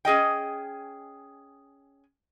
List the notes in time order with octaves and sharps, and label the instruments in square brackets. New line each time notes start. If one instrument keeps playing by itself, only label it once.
[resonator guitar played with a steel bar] C#4 G#4 D#5 G5